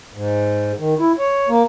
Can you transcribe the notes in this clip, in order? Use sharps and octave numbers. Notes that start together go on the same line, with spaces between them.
G#2
D#3
E4
C#5
A#3